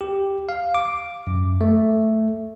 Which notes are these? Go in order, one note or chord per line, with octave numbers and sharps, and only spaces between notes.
G4
F5
D6
F#2
A3